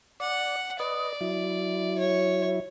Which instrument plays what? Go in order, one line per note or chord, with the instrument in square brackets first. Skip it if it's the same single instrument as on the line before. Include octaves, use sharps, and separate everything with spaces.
[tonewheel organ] D5 [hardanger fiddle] F#5
[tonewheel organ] B4 D#5 [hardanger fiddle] D5
[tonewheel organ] F#3 E4
[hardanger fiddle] C#5